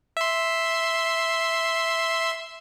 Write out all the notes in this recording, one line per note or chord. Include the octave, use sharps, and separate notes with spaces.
E5 C6